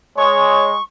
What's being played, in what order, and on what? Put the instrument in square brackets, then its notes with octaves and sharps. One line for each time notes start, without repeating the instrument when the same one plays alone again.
[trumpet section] G#3 [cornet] C#5 [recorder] C#6